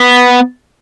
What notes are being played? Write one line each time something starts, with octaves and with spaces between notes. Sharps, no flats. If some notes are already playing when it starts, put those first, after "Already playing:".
Already playing: B3